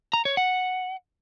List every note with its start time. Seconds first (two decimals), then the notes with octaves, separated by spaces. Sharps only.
0.13 A#5
0.25 C#5
0.37 F#5